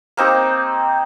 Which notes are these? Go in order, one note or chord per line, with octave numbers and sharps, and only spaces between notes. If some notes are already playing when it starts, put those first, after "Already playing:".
A#3 C4 D#4 G4